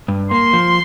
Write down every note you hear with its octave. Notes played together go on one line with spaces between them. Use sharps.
G2
A#3 C6
F3